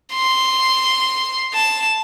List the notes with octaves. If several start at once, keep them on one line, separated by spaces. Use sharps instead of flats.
C6
A5